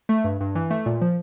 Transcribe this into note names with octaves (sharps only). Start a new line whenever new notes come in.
A3
G2
G2
E3
A3
A#2
F3